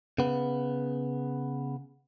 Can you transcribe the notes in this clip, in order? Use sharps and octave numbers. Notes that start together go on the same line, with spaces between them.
C#3 B3